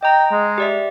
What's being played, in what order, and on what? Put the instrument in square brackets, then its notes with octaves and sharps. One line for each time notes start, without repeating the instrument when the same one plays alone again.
[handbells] D#5 A#5 [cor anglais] G5
[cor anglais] G#3
[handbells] G4 D5 E5